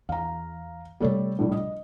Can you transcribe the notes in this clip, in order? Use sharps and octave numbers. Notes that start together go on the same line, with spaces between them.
E2 F5 A#5
C3 G3 A3 A#3 A4 C#5
A#1 A2 G3
D#5